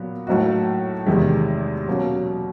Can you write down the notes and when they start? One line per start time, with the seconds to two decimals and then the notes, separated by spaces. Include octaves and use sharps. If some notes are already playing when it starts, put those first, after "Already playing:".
Already playing: A#2 F#3 B3
0.27 A2 F#3 A#3 D#4 F#4
1.07 E2 C3 D#3 G#3
1.87 B2 F#3 A#3 C#4